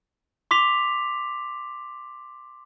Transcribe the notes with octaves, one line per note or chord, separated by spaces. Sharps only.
C6 D6 B6 F7